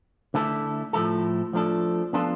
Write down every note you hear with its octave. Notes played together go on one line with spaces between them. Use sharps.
D3 A3 E4 A4
A2 F3 A3 E4 A4
F3 A3 D4 A4
F3 B3 D4 F4 A4